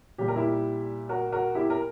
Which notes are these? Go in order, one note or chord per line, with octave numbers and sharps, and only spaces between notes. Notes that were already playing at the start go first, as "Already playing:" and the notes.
A#2 G3 G4
A#4
E4 G4
F#4 A#4
F#4 A#4
E4 G4
A#4